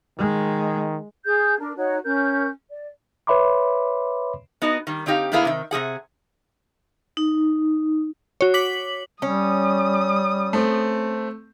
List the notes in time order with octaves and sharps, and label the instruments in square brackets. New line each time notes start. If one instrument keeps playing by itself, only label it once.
[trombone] D#3 [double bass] G#3
[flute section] G#4 G6
D4 A#4
D#4 F#4 C#5 F#6
C#4 A#4 G6
D5
[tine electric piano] B4 C#5 E5 B5 C6 D6
[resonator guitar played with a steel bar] B3 D#4 F#4 D#5
D#3 G3
D3 C4 D#4 G4 D#5 F5
D3 A#3 B3 E4 G#4 F5
C3 D#3
C3 G3 G#4 F#5
[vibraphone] D#4
[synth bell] F#4 C#5
D6 B6 F#7
[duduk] G3 [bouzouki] C#4 [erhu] D#6
[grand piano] A3 C4